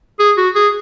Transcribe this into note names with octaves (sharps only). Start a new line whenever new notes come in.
G#4
F#4
G#4